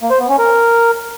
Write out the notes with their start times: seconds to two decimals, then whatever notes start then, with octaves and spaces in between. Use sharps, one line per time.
0.01 A#3
0.10 C5
0.20 B3
0.29 C#4
0.39 A#4